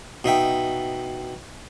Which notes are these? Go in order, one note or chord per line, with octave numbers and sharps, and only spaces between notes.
B2 D#4 E5 G5